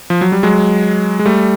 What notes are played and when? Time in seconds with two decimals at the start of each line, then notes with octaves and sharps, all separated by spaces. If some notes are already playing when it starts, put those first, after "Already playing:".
0.10 F3
0.21 F#3
0.32 G3
0.43 F#3 G#3
1.19 G#3
1.25 G3 A3